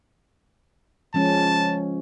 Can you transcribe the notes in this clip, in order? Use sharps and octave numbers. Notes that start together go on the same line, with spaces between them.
F3 G#3 C#4 A5